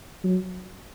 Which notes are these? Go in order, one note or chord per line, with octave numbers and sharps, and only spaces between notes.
F#3